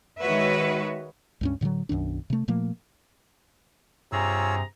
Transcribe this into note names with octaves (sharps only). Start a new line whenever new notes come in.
D#3 G#3 F#4 B4 C#5 E5
C#2 G2 C#4
A2 D3 E3 F#3
B1 F#2 D#3 D4
C3 A3
A#2 F3 A3 A#3
G2 C3 F4 G#4 C#5 G#5 A#5 E6